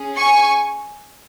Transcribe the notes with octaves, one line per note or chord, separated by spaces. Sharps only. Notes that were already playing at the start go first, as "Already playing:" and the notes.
Already playing: C#4 G#4
G#5 C#6